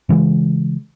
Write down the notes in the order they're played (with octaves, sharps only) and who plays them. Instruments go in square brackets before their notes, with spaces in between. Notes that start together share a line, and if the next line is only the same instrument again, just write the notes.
[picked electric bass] C#3 E3 G#3